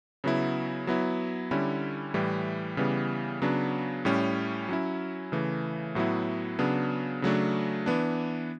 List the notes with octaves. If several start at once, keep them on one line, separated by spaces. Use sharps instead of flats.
C#3 F#3 B3 E4
F#3 B3 E4
D3 G3 C#4 E4
A2 E3 G3
C#3 E3 G3 B3
C#3 F#3 B3 D4
A2 G3 C#4
F#3 C#4 E4
C#3 E3 A3
A2 F#3 B3 E4
C#3 F#3 B3 D4
C#3 F#3 A3 D4
E3 B3 D4